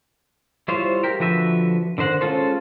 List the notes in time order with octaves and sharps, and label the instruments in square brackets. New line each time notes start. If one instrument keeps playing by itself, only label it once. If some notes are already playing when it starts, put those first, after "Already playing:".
[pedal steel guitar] G3 E4 F4 C5 C#5
G4 A#4
D3 F3 F#4 B4 E5
D3 D#3 C5 F#5
G#3 C#4 F4 A4 C5